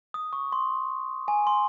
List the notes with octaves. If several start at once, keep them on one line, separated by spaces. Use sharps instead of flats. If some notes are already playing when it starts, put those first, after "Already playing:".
D#6
C#6
C6
G#5
C6